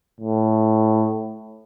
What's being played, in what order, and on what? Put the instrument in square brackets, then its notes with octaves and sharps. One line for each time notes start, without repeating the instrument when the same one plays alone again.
[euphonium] A2